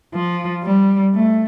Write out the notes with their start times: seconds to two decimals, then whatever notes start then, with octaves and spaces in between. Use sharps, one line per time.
0.14 F3
0.64 G3
1.15 A3